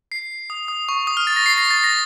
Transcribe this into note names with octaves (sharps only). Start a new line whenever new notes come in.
C7
D#6
D#6
C#6
D#6
F6
A6
A#6
C7
A#6
A6
A#6